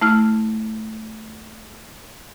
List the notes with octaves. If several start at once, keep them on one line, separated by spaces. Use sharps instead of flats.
A3 E4 F6